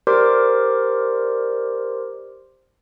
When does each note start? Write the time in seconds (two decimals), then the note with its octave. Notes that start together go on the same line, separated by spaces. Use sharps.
0.07 G4 A#4 C5 D5 C6 D6